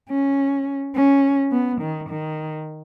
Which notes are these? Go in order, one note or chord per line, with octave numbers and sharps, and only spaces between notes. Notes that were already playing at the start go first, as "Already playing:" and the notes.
C#4
C#4
B3
D#3
D#3